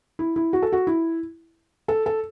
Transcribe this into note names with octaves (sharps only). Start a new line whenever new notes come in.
E4
E4
F#4
A4
F#4
E4
A4
A4